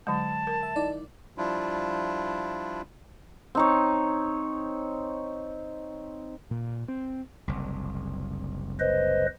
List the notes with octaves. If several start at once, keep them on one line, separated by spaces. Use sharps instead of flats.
D3 F#3 G#3 A5
A#4
E5
D#4 E4 D5
F3 G3 D4 E4 F4
C4 D#4 C#5
A#2
C4
F#1 C2
B4 C5 D#5